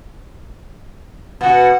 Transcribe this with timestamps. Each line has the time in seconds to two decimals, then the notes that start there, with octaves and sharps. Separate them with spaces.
1.41 B2 F#4 F#5